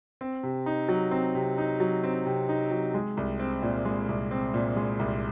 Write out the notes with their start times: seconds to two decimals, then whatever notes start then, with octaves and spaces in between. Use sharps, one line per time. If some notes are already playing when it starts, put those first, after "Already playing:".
0.21 C4
0.43 C3
0.66 D#4
0.89 F#3
1.11 C4
1.35 C3
1.58 D#4
1.80 F#3
2.04 C4
2.26 C3
2.49 D#4
2.71 F#3
2.94 G#3
3.17 C2
3.40 C4
3.62 A#2
3.85 G#3
4.09 C2
4.31 C4
4.54 A#2
4.76 G#3
4.99 C2